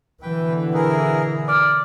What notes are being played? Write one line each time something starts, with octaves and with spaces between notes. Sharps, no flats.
B2 D3 E3 B4 G5
E4 G#4 A#4
D5 D6 F6